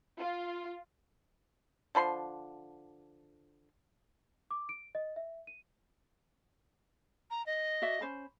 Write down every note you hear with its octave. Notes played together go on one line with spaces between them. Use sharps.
F4
D3 F3 B5 C6
D6
D7
D#5
E5
D#7
A#5
D#5
F#4 D5 E5
C#4 C5 B5